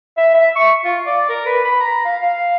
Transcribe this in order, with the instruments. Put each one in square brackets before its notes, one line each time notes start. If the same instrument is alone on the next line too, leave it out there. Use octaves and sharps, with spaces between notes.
[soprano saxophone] E5
E5
C#6
F4
D5
A#4
B4
B5
A#5
F5
F5